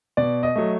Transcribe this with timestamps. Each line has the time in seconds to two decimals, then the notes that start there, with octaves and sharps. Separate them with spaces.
0.17 B2 D5
0.43 D#5
0.56 F#3 A3